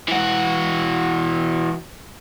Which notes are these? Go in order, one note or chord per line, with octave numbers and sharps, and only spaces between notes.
E3 F#4